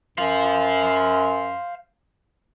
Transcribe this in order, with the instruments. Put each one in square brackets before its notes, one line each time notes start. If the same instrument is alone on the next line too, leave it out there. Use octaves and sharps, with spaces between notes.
[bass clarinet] F#2 [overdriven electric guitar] C5 F5